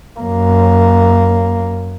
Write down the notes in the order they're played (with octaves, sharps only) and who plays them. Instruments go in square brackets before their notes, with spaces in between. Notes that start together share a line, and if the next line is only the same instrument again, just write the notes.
[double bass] F#2 A#3